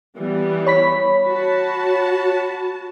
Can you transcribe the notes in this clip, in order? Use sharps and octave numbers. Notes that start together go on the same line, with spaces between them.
E3 G3 B3
C#5 B5 B6
F#4 A5